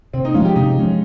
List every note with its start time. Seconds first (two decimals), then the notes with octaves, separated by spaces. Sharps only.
0.13 C3 C4
0.25 D#4
0.34 F3 G#3 C#4 F4
0.45 G4
0.56 C3 D#4
0.77 F3 G#3 C#4